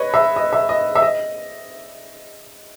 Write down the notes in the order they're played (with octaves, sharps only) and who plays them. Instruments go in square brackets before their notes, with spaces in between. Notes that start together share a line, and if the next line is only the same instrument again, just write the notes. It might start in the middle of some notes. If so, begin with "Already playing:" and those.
Already playing: [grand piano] B4 C#5 D#5
E5
D#5
E5
D#5
E5
D#5